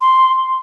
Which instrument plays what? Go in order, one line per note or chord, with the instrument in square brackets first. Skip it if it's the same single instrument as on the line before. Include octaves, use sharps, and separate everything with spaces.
[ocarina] C6